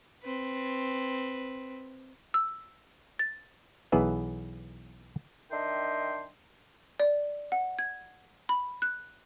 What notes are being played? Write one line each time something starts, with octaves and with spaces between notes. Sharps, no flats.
C4 B4
E6
A6
B1 E3 B3 G#4 B4 E5
D#3 D4 D#5 E5 G5 C6
D5
F#5
G#6
B5
F#6